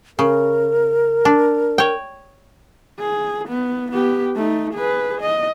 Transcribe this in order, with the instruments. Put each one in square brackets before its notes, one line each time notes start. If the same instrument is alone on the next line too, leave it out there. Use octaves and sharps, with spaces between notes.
[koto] C#3 [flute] A#4
[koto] D4
C#5 G5
[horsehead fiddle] G#4
B3
B3 G4
A3 D#4
G#4 B4
D#5